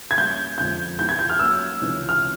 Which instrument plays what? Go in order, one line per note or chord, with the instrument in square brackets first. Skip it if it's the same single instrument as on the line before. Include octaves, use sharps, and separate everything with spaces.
[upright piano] G#6
[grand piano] G3 A#3 C#4 F#4 [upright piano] G6
[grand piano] F2 D3 F3 G#3 [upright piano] G6
[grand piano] B2 G#3 B3 E4 G4 [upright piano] G6
[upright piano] G#6
G6
F6
[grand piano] F#3 A#3 C#4 F#4 [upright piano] E6
[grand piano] C#2 C3 E3 G#3 C#4
[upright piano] F6